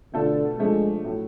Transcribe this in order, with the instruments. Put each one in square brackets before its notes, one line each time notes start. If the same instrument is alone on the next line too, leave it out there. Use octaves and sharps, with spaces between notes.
[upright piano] B2 A3 F4 A4 [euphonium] D3
[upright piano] F3 A3 D4 [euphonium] G#3
[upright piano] A2 F#3 A3